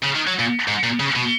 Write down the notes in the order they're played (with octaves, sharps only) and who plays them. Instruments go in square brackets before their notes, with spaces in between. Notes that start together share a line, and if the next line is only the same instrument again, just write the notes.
[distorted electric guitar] C#3
D#3
F#3
A#2
G#2
A#2
C#3
B2